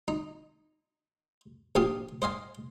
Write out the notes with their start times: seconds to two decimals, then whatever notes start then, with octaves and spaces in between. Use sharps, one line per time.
0.08 D#4
1.75 A#1 F3 G4 F5 D#6
2.22 C5 D#5 F5 G#5